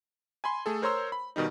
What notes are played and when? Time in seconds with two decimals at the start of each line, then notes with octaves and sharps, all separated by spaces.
0.44 G#5 B5 C6
0.66 A3 G#4 A4
0.82 A#4 C5 C#5 A#5 C6 E6
1.12 B5
1.36 B2 D#3 G3 D#4